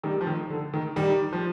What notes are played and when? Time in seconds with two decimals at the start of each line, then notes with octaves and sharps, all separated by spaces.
0.03 D#3 G3
0.21 F3
0.27 D#3
0.50 D3
0.74 D#3
0.96 D#3 G3
1.33 F3